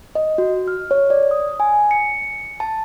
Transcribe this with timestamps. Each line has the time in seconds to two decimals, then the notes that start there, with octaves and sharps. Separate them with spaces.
0.15 D#5
0.38 F#4
0.68 F6
0.91 C#5
1.10 D5
1.31 D#6
1.60 G#5
1.91 C#7
2.60 A5